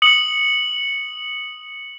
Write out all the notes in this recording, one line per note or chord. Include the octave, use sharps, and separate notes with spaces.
D#6 C#7 F#7